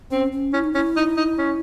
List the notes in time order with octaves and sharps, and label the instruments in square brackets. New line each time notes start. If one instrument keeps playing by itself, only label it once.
[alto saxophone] C4 [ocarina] C#4
[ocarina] C#4
[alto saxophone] C#4 [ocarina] E4
[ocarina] D#4
[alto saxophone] C#4 [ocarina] E4
[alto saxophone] D#4
D#4
C#4